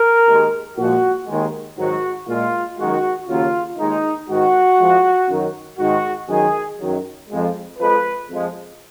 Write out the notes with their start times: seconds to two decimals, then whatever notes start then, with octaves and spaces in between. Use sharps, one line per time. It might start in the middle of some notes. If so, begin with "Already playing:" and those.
Already playing: A#4
0.27 D#2 D#3 G#3
0.78 A#2 F3 G#3 F#4
1.27 D#2 D#3 G#3
1.78 G#2 D#3 F#3 F#4
2.28 A#2 G#3 F4
2.78 F#2 D#3 G#3 F#4
3.28 D#2 C#3 F#3 F4
3.78 D#2 D#3 G#3 D#4
4.28 G#2 D#3 G#3 F#4
4.79 F2 F3 G#3
5.29 F#2 D#3 F#3
5.79 G#2 D#3 G#3 F#4
6.29 F#2 D#3 G#3 G#4
6.79 F#2 D#3 F#3
7.30 F2 F3 G#3
7.79 F2 F3 G#3 B4
8.30 F2 F3 G#3